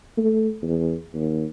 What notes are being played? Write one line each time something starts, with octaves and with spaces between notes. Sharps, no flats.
A3
E2
D#2